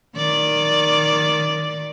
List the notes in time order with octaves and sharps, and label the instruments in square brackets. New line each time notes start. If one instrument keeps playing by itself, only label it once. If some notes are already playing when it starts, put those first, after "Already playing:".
[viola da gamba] D#3 D5